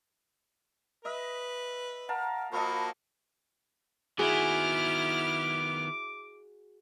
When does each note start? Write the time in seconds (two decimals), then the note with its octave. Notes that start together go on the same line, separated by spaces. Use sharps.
1.05 B4 D#5 E5
2.09 A#4 F5 F#5 A5
2.52 F3 A#3 F#4 A4 D#5 B5
4.19 D#3 B3 E4 F#4 G#4 D6 F6